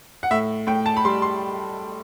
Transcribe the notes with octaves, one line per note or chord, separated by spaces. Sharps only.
F#5
A2 E5
A2 G5
A5
B5
G3 C6
C6